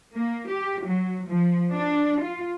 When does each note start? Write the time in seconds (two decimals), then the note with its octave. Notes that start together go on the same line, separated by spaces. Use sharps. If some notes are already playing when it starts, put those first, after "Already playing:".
0.14 A#3
0.49 G4
0.84 F#3
1.29 F3
1.75 D4
2.24 F4